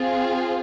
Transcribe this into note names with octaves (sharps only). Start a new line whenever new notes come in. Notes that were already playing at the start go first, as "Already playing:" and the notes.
Already playing: C4 F4 G#4